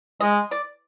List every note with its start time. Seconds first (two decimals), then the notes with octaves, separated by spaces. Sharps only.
0.20 G#3 D#5
0.51 D5